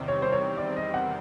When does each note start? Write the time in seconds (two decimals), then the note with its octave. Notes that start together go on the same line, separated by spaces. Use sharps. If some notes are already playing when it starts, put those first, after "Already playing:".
Already playing: E2 C3 D#3 G3 C4
0.08 C#5
0.22 C5
0.33 C#5
0.58 D5
0.76 D#5
0.94 F#5